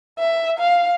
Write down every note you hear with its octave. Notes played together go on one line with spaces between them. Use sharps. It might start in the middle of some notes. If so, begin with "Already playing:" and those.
E5
F5